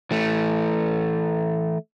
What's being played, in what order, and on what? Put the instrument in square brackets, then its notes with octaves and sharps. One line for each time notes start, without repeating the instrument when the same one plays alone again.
[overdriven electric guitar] E3 A3